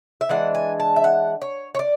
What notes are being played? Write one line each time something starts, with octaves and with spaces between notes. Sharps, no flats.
E5
E3 G#3 D4 F#5
G#5
A5
E5
F#5
C#5
C#5
D5